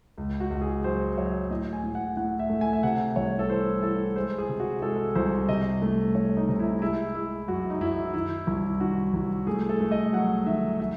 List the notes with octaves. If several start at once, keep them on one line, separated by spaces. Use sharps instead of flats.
C#2
F#4
C#2
G#4
F#3 C5
F#3 C#5
A2 D#5
G#5
A2
F#5
A2 F#5
E5
A3
G#5
E5
C3 F#5
C2 C#5
A4
E3 C5
E3 A4
G#3 C5
G#4
C3
F#4
G#3 A4
C2 C5
C3 D#5
A3
A3 C#5
D#4
C3
E4
G#3 E4
G#3 E4
F#2 F#4
D#4
F#2 E4
D#3 E4
C2
D#3 F#4
C2
A3 G#4
A4
A3
D#5
F#3 F#5
D#3 E5
F#3 E5